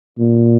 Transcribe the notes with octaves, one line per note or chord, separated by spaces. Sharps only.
A#2